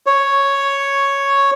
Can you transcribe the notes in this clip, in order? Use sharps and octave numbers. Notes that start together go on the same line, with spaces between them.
C#5